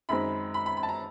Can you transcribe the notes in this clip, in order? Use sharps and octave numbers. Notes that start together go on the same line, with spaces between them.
F#2 D#3 G#3 C4 B5
B5
B5
B5
A5
A#5